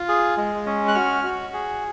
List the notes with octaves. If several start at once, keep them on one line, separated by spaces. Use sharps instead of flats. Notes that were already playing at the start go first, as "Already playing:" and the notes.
Already playing: F4
G#4
G#3
C#4
F#6
F#4 F6
F#4
G#4